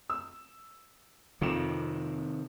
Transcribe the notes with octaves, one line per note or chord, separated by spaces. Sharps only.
E6
F2 C3 D#3 E7